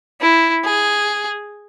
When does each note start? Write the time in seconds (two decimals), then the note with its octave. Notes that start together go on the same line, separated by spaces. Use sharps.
0.21 E4
0.64 G#4